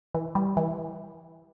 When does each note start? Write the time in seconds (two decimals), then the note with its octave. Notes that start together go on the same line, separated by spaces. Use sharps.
0.14 E3
0.35 G3
0.57 E3